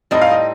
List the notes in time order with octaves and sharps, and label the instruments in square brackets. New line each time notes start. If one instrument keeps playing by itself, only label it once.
[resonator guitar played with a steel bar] A2 G3 C4 D#4 [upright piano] D#5
[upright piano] F5
D#5